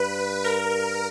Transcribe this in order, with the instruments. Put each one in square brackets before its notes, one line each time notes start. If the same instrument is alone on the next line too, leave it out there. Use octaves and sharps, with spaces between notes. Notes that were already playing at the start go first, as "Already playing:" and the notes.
Already playing: [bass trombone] G2 [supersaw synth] B4
[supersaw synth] A#4